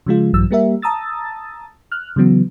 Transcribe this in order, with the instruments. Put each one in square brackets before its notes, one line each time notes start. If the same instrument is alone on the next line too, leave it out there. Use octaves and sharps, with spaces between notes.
[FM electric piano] C#3 F3 G#3 F4
A#1 G2 E3 F#3 E6
G3 A#3 G4 A#4 E5
A5 A#5 D#6 E6 A6
F6 F#6
C#3 E3 F#3 B3